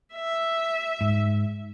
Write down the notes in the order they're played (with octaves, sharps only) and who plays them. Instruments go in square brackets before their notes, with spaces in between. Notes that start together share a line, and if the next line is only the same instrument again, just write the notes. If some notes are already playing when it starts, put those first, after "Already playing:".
[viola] E5
[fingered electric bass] G#2